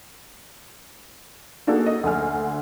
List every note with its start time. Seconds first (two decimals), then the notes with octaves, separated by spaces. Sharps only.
1.67 A#3 D4 D#4 F#4 G#4 A4
1.86 D#5
2.03 D2 D3 G#5 F6